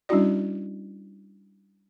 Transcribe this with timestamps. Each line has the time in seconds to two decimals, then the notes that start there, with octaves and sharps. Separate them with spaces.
0.09 G3 C#4 D4 E4 F#4 D5